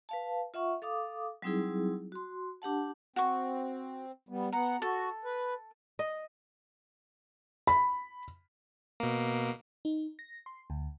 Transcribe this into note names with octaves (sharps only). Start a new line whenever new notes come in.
B4 F5 A5
F4 E5 F#5 C#6
A4 F5 D6 D#6
F#3 G3 C4 D#4 E4 G#4
F#4 C6
D4 G4 F#5 A5
C4 F#4 C#6
G3 B3
B3 F#5 A#5
F#4 A4
B4
D#5
B5
B2 A#3
D#4
A#6
C6
D2